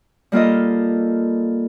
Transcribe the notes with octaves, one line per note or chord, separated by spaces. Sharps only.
G3 A#3 F4 A4 D#5